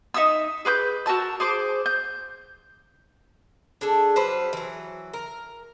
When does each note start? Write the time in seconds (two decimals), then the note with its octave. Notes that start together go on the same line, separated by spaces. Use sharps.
0.14 D#4 E5 D#6 E6
0.65 G#4 B4 D6 G6
1.06 F#4 A#4 A5 E6
1.40 G#4 C5 D6
1.86 G6
3.81 D4 G#4 A4
4.16 F#3 G3 B4 C5
4.53 E3 F#3
5.14 A#4